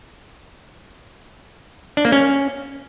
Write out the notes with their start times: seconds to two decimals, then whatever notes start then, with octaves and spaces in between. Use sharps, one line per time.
1.97 D4
2.05 A#3
2.12 C#4